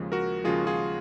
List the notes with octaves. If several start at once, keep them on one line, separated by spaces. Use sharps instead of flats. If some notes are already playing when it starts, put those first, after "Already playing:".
Already playing: D#2 C#3 F3 G#3
F#4 A#4
D#2 C#3 F3 G#3 F4 G#4
F4 G#4